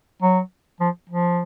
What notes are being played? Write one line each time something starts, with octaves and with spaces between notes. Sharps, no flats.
F#3
F3
F3